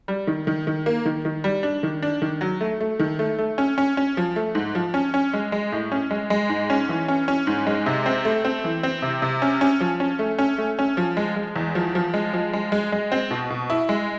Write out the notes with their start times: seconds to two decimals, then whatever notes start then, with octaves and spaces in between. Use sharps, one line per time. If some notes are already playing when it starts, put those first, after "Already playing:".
0.08 G3
0.27 D#3
0.47 D#3
0.67 D#3
0.86 A#3
1.06 D#3
1.25 D#3
1.44 G3
1.63 D4
1.83 D#3
2.02 D4
2.22 D#3
2.41 F#3
2.61 A3
2.81 A3
2.99 D#3
3.19 A3
3.38 A3
3.58 C#4
3.78 C#4
3.97 C#4
4.17 F3
4.36 A3
4.55 G#2
4.75 F3
4.94 C#4
5.14 C#4
5.33 G#3
5.52 G#3
5.72 A2
5.92 C#4
6.11 G#3
6.30 G#3
6.49 G#2
6.70 C#4
6.89 E3
7.08 C#4
7.28 C#4
7.47 G#2
7.67 G#3
7.86 C3
8.06 C4
8.25 A3
8.44 C4
8.64 E3
8.83 C4
9.02 C3
9.22 C3
9.42 C#4
9.61 C#4
9.81 F3
10.00 C#4
10.19 A3
10.39 C#4
10.58 A3
10.79 C#4
10.97 F3
11.17 G#3
11.36 G#3
11.56 E2
11.75 F3
11.95 F3
12.14 G#3
12.33 F3
12.53 G#3
12.72 G#3
12.92 G#3
13.12 C4
13.31 B2
13.50 B2
13.70 E4
13.89 G#3